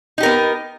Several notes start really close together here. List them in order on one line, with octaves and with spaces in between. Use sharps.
D#4 G4 A#4 B3